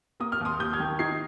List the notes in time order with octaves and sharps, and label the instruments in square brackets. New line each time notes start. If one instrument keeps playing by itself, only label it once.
[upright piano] A#3 D#6
F6
D#2 C6 D#6
D#2 D#6 G6
F6 G#6
D#3
D#4 G#6 C7